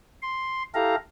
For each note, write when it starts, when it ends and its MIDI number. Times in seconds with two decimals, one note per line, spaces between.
0.22 0.63 84
0.75 0.95 64
0.75 0.95 67
0.75 0.95 69
0.75 0.95 77
0.75 0.95 82